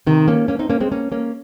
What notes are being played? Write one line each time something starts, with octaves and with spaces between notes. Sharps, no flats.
C3 D#3
A#3 C#4
A#3 C#4
C4 D#4
A#3 C#4
G#3 C4
A#3 C#4
A#3 C#4